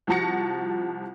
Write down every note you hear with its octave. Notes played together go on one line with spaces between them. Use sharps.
C2 F3 F#4 A5 A#6 C#7